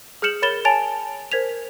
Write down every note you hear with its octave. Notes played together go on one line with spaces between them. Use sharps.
G#4 F6 G6 C#7 E7 F#7
A#4 C#5 B5 A6 E7 G7
C#5 G#5 A5 A6 D7 F7
A#4 C5 G#6 B6 F7